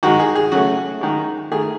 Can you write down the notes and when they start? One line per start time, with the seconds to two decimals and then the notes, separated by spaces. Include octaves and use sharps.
0.03 D#3 G#3 F#4
0.20 G#4
0.35 G#4
0.51 C#3 F#3 A3 F#4
1.01 D#3 G#3
1.51 D#3 A3 G#4